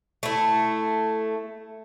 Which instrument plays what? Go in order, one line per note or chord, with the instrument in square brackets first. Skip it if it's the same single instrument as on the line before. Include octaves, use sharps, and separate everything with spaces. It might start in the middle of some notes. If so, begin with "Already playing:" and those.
[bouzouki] A3 E4